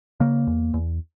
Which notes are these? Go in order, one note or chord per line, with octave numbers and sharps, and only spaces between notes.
C#3 A#3
E2
E2